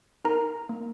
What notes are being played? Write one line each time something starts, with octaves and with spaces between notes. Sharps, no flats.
D#4 A#4 A#5
A#3